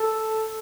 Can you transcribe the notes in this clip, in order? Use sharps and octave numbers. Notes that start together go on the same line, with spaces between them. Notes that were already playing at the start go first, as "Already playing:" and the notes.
Already playing: A4